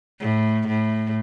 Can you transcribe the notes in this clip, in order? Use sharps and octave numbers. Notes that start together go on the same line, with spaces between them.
A2
A2